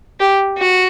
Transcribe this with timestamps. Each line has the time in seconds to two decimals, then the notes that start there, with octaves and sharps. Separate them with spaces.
0.20 G4
0.58 F#4